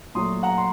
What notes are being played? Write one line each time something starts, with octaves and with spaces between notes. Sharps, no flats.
A#2 F#3 A3 C6 D#6
F#5 A#5
C6